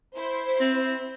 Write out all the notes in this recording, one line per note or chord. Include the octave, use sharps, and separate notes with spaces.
E4 C5
C4